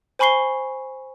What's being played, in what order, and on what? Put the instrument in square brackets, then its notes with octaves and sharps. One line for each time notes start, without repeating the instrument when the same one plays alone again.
[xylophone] C5 G#5 B5 C#6 C7 G7